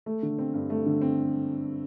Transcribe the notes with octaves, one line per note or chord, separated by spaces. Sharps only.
A3
D3
C4
G2
A3
D3
C4